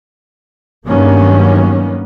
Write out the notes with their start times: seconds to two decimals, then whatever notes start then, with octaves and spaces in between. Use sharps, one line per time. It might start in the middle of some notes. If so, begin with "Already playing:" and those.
0.86 G2 D#3 F#3 A#3 B3 C#4